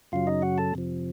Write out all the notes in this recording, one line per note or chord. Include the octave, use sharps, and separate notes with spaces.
F#2 C#3 F#3 F4 F5
D#4 D#5
F#4 F#5
A4 A5
F2 C3 F3